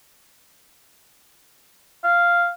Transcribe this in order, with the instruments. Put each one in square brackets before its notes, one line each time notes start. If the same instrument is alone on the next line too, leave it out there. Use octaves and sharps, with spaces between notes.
[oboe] F5